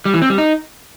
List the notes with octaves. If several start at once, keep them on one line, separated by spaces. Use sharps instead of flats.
G3
E3
C4
G3
D#4